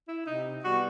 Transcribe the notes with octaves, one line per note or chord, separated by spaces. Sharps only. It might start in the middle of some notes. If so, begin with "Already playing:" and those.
E4
C3 D#4
E3 G3 B3 F#4